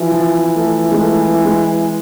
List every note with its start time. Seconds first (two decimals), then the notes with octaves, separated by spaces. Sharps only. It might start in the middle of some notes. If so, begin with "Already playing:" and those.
Already playing: E3 F3
0.12 F3
0.56 A3
0.92 G#3
1.00 A3
1.45 G#3